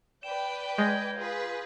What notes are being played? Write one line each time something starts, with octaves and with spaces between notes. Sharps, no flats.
B4 D5 G5 E7
G#3 G6 G#6 A#6
F4 G#4 B4